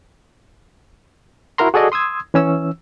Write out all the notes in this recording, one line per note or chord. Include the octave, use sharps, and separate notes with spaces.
E4 F#4 A#4 A#5 C6
F#4 G#4 A4 D5 D#5
C6 D#6 E6 G#6
E3 C#4 E6